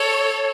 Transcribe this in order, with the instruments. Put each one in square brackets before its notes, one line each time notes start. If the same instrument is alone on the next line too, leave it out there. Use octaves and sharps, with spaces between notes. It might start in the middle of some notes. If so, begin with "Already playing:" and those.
Already playing: [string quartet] A4 C#5